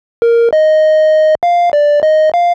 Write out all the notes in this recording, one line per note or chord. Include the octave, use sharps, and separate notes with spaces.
A#4
D#5
F5
D5
D#5
F5